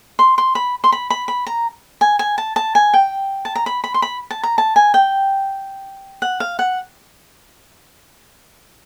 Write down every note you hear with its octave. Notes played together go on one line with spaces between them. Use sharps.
C6
C6
B5
C6
B5
B5
B5
A#5
G#5
G#5
A5
A5
G#5
G5
A5
A#5
B5
B5
C6
B5
A5
A#5
A5
G#5
G5
F#5
F5
F#5